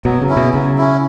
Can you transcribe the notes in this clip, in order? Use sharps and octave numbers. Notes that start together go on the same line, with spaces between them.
B2 F#3
C#3
C#4 E4
B2
C#3 F#3
C#4 E4